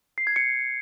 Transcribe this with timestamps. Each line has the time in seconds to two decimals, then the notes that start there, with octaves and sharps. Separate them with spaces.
0.18 C7
0.27 G#6
0.36 C#7